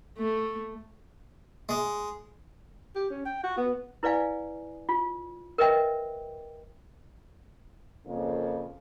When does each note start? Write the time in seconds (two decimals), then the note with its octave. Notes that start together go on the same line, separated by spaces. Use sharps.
0.18 A3
1.69 G#3
2.96 G4
3.10 C#4
3.26 G5
3.44 F#4
3.57 B3
4.03 E4 B4 D5 F5 G#5
4.89 F4
5.58 A#4 B4 D#5 E5 G5
8.05 F2 C#3 A#3